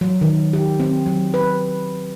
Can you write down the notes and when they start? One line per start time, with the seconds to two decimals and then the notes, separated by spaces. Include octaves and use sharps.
0.01 F#3
0.21 D#3
0.53 G4
0.80 C4
1.06 F#3
1.34 B4